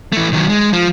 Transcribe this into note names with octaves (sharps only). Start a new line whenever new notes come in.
E3 A3
D#3 F#3
G#3
F3